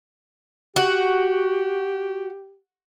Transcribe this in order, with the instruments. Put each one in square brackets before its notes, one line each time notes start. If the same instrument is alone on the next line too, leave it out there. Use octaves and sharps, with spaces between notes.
[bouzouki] F#4 [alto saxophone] G4